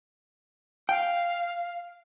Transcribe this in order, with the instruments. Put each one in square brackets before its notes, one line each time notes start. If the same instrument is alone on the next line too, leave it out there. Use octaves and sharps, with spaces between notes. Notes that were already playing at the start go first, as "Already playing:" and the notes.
[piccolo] F5 [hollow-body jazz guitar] G5